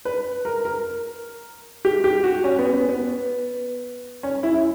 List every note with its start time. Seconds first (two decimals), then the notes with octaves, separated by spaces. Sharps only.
0.05 B4
0.45 A#4
0.65 A#4
1.85 G4
2.04 G4
2.24 F#4
2.44 C#4
2.59 B3
2.74 B3
2.89 B3
4.23 C#4
4.43 E4
4.54 E4